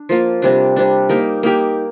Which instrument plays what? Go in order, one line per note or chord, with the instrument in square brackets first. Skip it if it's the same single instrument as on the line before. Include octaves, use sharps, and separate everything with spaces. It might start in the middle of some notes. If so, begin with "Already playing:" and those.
Already playing: [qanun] D4
F3 A#3 F4
C3 G3 D4
C3 G3 D4
A#3 D#4 G4 A#4
A#3 D#4 G4 A#4